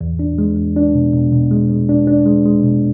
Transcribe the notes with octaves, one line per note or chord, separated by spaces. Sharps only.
E2
D4
G#3
E2
D4
B2
B2
B2
G#3
G#3
D4
D4
G#3
G#3
B2